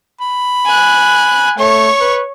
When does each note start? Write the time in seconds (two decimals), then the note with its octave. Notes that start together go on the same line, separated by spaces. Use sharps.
0.21 B5
0.65 G#5 F#6
1.58 A3 C#5 C#6
2.01 B4